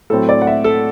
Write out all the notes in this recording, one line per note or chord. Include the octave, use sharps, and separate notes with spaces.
A2 F#3 C4 A4
D5
F#5
E5
A4